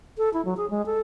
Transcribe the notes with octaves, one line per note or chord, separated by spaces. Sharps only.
A4
E4
F#3
G#4
G#3
A4